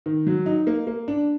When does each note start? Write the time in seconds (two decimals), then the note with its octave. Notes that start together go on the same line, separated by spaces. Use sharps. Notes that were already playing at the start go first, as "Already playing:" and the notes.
0.06 D#3
0.27 F#3
0.46 D#4
0.67 A#3
0.87 A#3
1.08 D4